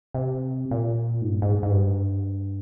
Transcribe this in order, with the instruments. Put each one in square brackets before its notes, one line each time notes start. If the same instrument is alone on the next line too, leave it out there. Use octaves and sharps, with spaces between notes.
[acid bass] C3
A#2
G#2
G2
G#2
G#2
G2